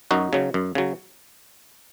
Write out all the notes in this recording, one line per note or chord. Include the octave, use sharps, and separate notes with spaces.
F#2 D#4 F#4
C#3 F#3
F#2
C#3 F#3